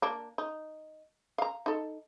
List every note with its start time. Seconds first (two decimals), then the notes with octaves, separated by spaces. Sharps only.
0.02 A#3 D4
0.38 D#4
1.38 F5 A#5
1.66 D#4 A4